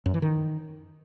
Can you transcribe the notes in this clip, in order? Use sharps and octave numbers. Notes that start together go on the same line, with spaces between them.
F#2
E3
D#3